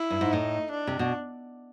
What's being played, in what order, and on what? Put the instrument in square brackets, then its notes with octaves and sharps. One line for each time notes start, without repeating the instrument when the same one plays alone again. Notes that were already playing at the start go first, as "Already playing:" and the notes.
Already playing: [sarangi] E4
[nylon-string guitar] G2
G#2
[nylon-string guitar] A2 [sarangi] D#4
[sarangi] D4
[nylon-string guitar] C3
B2